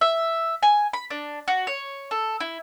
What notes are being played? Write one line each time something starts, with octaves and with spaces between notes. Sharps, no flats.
E5
G#5
B5
D4
F#4
C#5
A4
E4